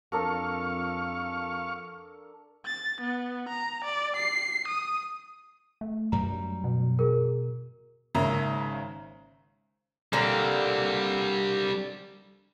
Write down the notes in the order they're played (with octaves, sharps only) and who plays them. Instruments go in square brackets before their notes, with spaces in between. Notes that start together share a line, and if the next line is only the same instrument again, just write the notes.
[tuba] F2 [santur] D4 A4 A#4 [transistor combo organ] F5 C#6
[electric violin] A6
B3
A#5
D5
C7
D#6
[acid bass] A3
[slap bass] F#2 F#3 G3 [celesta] A#5
[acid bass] B2
[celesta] G#4 A#4
[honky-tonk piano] G#1 C#3 A#3 E5 A#5
[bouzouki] D3 A#3 [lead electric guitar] G3 C4